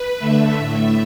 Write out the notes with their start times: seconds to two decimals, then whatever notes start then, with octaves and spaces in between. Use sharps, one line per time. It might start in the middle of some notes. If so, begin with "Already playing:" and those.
Already playing: B4
0.19 D3 A3 E5
0.58 A2 A3